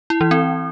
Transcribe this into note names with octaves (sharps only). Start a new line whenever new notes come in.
E4
E3
C4